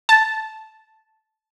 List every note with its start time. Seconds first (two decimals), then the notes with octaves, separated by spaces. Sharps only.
0.09 A5